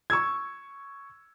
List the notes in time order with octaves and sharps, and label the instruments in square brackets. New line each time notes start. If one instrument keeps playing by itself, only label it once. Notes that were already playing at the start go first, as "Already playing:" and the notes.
[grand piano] C#6 E6 G#6